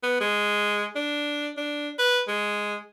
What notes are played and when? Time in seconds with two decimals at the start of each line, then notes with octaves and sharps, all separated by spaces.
0.03 B3
0.20 G#3
0.96 D4
1.57 D4
1.99 B4
2.28 G#3